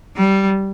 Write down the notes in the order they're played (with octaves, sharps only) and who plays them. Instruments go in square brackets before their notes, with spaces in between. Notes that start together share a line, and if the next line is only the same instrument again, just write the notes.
[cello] G3